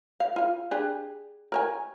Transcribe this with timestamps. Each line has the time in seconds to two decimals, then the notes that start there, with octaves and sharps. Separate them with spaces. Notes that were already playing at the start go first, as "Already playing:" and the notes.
0.20 F5
0.36 F4 F5
0.71 D4 G4 G#4
1.52 A#4 C#5 G#5